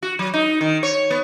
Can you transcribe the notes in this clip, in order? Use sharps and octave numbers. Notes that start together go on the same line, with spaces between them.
F#4
F#3
D#4
D#3
C#5
B3